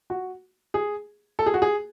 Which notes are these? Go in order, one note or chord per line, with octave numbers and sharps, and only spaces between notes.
F#4
G#4
A4
G#4
F#4
G#4